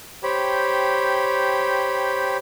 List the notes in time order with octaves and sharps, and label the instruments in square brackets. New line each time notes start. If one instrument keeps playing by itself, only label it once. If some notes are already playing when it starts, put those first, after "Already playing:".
[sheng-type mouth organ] G4 C5 C#5 G5 B5